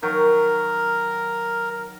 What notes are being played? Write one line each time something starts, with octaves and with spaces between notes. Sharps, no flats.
D#3 F#3 A#4